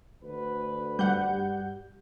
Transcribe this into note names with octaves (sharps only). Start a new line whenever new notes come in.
D2 D3 B4
G2 G3 F#5 G6